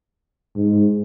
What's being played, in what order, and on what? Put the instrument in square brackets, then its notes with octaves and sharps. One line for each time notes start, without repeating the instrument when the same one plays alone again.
[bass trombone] G#2